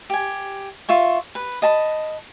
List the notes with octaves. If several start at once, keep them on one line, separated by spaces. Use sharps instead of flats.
G4 G#5
F4 E5 C#6
B4
D#5 A5 B5